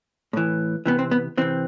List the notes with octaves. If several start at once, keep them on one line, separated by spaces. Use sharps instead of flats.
A2 E3
C3 E3 B3
C4
B3
C3 E3 C4